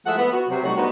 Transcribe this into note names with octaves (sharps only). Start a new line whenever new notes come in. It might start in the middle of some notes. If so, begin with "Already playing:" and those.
F3 G#3 A3 E5 F#5
B3
F#4
C3 F#3
G3 A3 D#4 F#4
B3 D4 D#4 F#4 C5